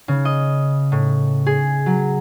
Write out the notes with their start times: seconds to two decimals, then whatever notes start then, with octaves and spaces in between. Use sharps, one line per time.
0.08 C#3
0.25 D#5
0.92 A2
1.46 G#4
1.86 F#3